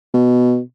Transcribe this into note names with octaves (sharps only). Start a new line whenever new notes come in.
B2